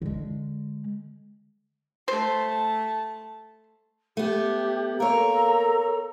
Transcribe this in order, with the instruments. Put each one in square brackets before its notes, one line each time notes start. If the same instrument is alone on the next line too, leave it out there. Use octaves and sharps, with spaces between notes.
[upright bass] D3 G#3
[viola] A3 A5 [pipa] C5
[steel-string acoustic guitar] A3 B3 [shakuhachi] G4
[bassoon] A#3 [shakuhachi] A4 [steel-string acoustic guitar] A#4 C#5 [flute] A#5